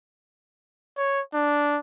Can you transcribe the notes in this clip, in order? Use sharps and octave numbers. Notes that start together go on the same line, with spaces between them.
C#5
D4